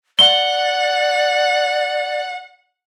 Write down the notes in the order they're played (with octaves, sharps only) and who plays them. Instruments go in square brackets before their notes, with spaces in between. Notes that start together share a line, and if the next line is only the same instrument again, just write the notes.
[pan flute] D5 [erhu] F#5 [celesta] G7